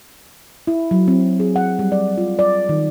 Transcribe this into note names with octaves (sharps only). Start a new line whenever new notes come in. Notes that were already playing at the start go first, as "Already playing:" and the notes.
E4
F#3
C4
G#4
F#5
G3
D5
F4
D5
D#3